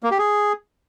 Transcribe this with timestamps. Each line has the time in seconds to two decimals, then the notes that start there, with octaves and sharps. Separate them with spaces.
0.03 A#3
0.11 G4
0.19 G#4